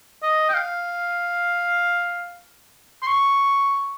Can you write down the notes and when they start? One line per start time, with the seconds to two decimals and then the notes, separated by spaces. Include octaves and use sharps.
0.22 D#5
0.49 G5
0.54 F5
3.02 C6
3.07 C#6